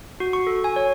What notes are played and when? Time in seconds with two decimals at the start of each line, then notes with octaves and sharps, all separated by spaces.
0.20 F#4
0.33 C#6
0.47 A4
0.64 G#5
0.76 C#5